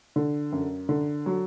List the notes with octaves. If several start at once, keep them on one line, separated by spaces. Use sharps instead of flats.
D3
F#2
D3
F#3